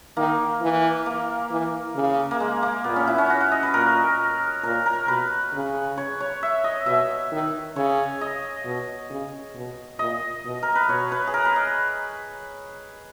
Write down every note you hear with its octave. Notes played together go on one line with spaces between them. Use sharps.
D#3 A#3
E3
A#3
E3
C#3
A#3
G#3
A#3
A#2 B3
C#4
E4
C#4
F#4
F#4
D#5
B4
A#2 A#4
A#2 A#4
A#4
B2 B4
C#3
C#5
C#5
E5
D#5
B2 E5
D#3
C#3 C#5
D#5
B2
C#3
B2
A#2 D#5
B2
A#4
B4
B2 C#5
B4
G#4
A#4
B4
D#5